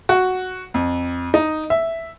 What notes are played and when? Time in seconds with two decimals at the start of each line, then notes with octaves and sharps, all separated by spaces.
0.09 F#4
0.74 F2
1.34 D#4
1.70 E5